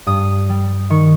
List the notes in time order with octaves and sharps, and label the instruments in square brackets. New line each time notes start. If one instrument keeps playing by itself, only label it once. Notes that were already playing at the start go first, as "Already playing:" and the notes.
[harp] G2 D#6
G3
D#3 C#6